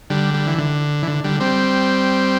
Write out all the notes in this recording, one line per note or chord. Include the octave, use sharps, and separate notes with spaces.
D3 G3
G3
E3
D3
E3
D3
D3 G3
G3 C4